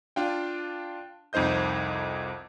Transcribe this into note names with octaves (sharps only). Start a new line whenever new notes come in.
D4 F4 F5 G5
C2 F2 D#4 C5 D#5 G6